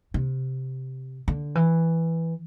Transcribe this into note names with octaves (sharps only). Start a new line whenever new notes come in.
C3
D3
E3